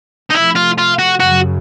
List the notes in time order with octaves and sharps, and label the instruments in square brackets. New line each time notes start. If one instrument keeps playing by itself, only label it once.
[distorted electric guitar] D#4
[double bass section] C3 F3 A3 [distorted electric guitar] E4
[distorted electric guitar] F4
F4
F#4
[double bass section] F#2 C#3 F#3 [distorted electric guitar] F#4